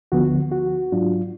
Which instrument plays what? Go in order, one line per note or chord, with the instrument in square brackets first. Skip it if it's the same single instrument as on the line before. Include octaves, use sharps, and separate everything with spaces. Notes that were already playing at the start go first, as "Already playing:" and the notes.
[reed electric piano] D2 D3 F3 B3 F#4
F#4
G#2 F#3 D4 F4